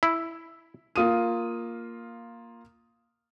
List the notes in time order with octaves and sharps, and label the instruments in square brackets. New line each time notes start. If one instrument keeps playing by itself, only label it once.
[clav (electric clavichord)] E4
[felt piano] A#3 F4 D#6 D#7